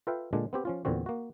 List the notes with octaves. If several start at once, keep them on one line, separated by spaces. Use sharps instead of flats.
F4 A4 B4 E5 F5 G5
A#2 D3 G#3 D4
B3 C4 G4
F3 C#4 F4
E2 A#2 D3 C4 F#4
A#3 F#4